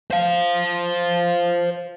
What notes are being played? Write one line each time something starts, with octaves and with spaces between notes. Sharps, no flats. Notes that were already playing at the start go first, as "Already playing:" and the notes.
C5 F5